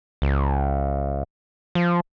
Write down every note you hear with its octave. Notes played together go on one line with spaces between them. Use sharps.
C#2
F3